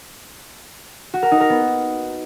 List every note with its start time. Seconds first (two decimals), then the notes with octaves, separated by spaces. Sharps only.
1.14 F#4
1.23 A#4
1.32 D#4
1.41 A#4
1.50 B3